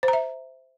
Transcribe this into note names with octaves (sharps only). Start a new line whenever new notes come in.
C5
A#5
E5